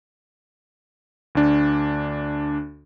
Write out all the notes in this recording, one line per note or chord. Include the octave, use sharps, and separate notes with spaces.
D2 D4